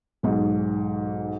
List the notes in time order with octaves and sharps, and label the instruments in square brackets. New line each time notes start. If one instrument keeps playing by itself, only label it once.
[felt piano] B1 G#2